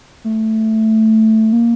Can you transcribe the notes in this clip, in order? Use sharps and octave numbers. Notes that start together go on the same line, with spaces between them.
A3
A#3